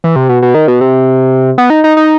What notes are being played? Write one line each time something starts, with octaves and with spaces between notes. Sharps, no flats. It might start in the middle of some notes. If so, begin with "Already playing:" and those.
E3
C3
B2
B2
D#3
B2
C3
B3
D#4
D#4
D#4